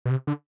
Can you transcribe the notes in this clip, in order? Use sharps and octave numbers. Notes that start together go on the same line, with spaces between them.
B2
C3
D3